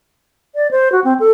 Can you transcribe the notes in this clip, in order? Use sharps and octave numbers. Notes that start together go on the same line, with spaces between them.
D5
C5
F#4
C4
A4